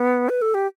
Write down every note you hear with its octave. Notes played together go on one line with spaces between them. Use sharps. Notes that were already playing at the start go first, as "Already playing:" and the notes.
Already playing: B3
B4
A4
G4